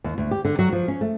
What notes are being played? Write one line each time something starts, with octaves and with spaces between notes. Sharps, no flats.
D#2
D2
G4
D3
F#3
F3
C#4
A3